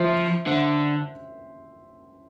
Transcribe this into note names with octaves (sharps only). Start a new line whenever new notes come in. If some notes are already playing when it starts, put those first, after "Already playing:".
Already playing: F3 C5 E5
D3 C5 E5